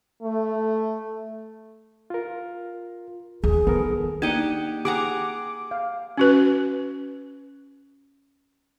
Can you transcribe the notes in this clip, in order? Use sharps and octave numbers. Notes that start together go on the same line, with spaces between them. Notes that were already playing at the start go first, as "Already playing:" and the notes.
A3
F4 A#4
D#2 G#4
D#3 B3 A4 A#4
A#3 D4 D#4 G4 D#5 F#5
G4 G#4 F#5 A#5 D6 D#6
F5
C#4 F#4 B4